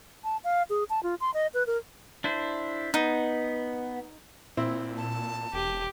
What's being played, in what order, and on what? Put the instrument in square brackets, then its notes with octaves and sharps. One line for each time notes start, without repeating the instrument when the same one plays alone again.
[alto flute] A5
F5
G#4
A5
F4
C6
D#5
B4
A#4
[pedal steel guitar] D4 E4 C5
[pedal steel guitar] B3 [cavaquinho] D#4
[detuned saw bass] A#2 [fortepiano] C4 E4
[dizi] A5
[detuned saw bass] E1 [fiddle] G4